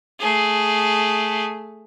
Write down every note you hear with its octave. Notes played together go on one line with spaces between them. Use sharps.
A3 G#4